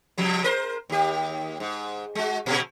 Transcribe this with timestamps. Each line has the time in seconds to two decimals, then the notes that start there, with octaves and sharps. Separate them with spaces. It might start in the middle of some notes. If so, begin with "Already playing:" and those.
0.18 C#3 F3
0.44 A#4 C5
0.90 D#2 G4
1.60 G#2
2.15 G#3 F#4
2.46 A#2 C#3